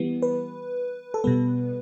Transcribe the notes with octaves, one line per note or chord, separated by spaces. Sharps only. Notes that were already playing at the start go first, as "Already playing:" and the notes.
Already playing: E3 G3 B3
B4
A4
B2 G3 B3 B4